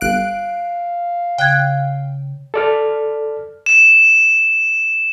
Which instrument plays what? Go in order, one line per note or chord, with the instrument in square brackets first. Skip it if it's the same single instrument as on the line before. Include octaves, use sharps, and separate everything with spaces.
[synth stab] G1 F#6 D7 [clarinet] F5
[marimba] C#3 F#6 G#6 [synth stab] G5
[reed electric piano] A4 D5 F6
[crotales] E7